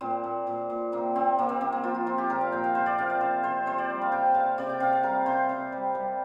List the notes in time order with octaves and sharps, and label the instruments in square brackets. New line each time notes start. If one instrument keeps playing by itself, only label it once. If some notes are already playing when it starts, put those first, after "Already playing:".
[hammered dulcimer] A#2 C4
A#2
A#2
A#2
C3 A#3
C3 C4
C3 A#3
C4
C3 C4
A#3
F3 F4
F4
F3 F4
G4
A#2 A#4
F5
A#2 G5
F5
C3 C5
D5
C3 F5
D5
C3 C5
C3 C5
C3 C5
D5
G3
F5
C3 G5
C3 F5
C3 D5
G5
C3 F5
F5
G3 A#4
C3 C5
C3
G3
G3